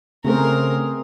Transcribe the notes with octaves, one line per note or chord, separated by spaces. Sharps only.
C#3 A3 B3 C4 G#4 A#4 C5